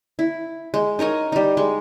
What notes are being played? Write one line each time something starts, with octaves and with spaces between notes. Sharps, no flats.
E4
G#3
D#4 A#4 C#5 D#5
G3 D#4
G#3